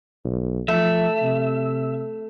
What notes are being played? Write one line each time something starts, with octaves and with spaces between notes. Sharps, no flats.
B1
F3 A3 E5
C3